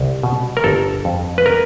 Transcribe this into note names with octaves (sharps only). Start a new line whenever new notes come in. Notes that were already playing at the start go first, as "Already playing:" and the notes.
Already playing: C2
B2
A#4
G1 A4
F2
B4
A#4